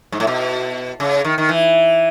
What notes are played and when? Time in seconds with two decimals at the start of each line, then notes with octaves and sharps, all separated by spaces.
0.12 G#2
0.20 A2
0.27 B2
1.00 C#3
1.25 D#3
1.38 D#3
1.49 E3